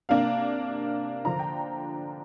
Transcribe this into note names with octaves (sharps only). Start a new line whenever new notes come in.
C3 A#3 D4 F5
D3 F3 D4 A#5
G5